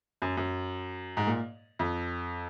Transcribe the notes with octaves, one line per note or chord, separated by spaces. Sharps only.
F#2
F#2
G#2
A#2
F2